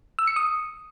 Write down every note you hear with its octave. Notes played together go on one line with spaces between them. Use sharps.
E6
C#7
D#6